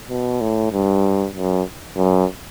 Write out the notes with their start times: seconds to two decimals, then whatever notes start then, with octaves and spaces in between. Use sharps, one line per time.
0.09 B2
0.41 A2
0.72 G2
1.34 F#2
1.97 F#2